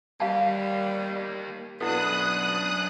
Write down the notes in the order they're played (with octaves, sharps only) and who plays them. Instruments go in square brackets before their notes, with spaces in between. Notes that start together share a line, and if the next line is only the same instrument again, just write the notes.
[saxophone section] G3 [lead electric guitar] A#3 G4 [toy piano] F5 A5
[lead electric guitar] F#2 D4 [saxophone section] B2 B3 [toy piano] E4 A4 [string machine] D#6 F#6